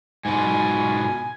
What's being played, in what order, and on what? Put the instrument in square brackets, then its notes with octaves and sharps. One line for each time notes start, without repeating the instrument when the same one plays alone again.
[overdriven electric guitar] G#2 B2 [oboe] G#5